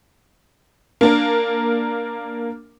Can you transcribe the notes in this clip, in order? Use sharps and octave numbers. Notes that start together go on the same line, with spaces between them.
A#3 D4 A#4